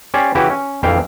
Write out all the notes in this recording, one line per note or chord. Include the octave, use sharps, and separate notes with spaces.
C#4 G4 C5 D5 G#5
C#3 E3 E4 F#4 G4 B4
C#4
A#1 F2 E3 E5 F5 G5